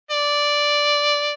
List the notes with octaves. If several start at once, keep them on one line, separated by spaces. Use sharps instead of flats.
D5